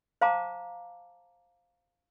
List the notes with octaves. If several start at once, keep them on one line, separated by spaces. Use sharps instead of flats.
C5 F5 A5 A#5 D6